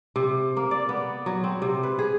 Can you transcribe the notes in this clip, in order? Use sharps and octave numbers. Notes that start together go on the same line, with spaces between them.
C3
A#3
D5
B3
F#3
C4
C3
B4
G#4